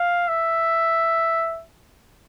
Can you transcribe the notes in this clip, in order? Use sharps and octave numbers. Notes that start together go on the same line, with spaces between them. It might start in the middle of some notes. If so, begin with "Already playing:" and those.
Already playing: F5
E5